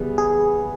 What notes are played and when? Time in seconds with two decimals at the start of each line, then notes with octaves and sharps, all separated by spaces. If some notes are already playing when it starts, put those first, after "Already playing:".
Already playing: C#3 E3 G3 B3 G#4
0.18 G#4